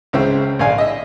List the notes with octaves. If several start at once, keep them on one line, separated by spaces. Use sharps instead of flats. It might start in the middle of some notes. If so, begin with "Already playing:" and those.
C#2 C#3 C4 E5
A#1 D5 F5 G#5
D#5 E5